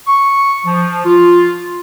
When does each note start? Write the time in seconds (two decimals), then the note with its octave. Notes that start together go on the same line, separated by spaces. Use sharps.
0.07 C#6
0.65 F3
1.05 F4